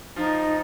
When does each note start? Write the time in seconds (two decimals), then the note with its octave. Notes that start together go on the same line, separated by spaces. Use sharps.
0.16 F3 D#4 F4